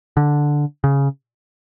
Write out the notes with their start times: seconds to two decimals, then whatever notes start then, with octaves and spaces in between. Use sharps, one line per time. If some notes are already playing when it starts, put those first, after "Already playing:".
0.17 D3
0.84 C#3